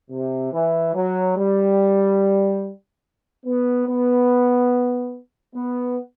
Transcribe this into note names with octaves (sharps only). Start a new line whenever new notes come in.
C3
E3
F#3
G3
B3
B3
B3